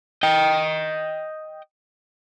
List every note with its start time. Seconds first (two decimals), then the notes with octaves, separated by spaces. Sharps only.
0.23 D#5 G5